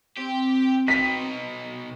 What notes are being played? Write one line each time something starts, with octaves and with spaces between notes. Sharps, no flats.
C4 G4
B2 D#4 B6